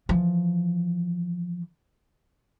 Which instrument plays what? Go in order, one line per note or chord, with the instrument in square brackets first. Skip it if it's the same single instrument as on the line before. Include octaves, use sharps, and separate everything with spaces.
[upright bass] E3 F3